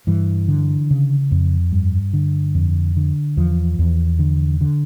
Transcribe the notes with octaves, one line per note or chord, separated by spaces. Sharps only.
G2 E3
D3
C#3
F2
G2
D3
F2
D3
E2 F3
E2
D3
D3